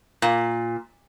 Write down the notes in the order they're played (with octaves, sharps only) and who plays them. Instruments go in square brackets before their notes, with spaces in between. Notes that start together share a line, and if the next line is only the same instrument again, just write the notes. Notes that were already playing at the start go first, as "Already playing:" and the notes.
[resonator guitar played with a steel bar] A#2